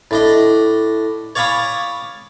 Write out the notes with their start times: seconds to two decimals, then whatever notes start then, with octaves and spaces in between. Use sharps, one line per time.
0.11 A2 D4 D#5
1.36 C#5 D5 F5 G#5 B5 D#6